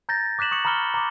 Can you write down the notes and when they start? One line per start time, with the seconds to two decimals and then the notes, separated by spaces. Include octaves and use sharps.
0.09 A#5 G6 A6 A#6
0.39 D6 F#6 B6 E7 F#7
0.51 C#6 D#6 C#7 F#7
0.65 A#5 B5 D#6 F6 C#7 G7
0.94 A#5 C6 D6